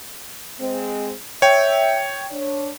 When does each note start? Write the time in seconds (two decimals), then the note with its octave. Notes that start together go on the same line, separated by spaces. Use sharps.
0.60 G#3 C4
1.42 C#5 E5 G5
2.31 D4 C#5